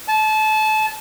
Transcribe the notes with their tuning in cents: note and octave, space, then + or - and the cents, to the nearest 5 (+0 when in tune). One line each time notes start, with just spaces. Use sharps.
A5 -25